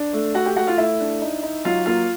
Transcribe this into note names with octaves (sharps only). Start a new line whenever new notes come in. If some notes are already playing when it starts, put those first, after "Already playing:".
Already playing: D4
A3
A3 F#4 F#5
G4 G5
A3 F#4 F#5
F4 F5
A3 E4 E5
D4
D#4
D#4
F#3 F4 F5
A#3 F4 F5